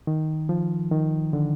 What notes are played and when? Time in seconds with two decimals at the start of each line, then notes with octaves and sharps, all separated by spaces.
0.07 D#3
0.49 F3
0.92 D#3
1.33 D3